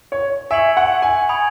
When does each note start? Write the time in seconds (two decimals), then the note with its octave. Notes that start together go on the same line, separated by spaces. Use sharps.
0.12 C#5
0.51 E5 G#5 C#6 G#6 C#7 F#7
0.77 F#5
1.02 G#5
1.29 G#5 B5 D#6 G#6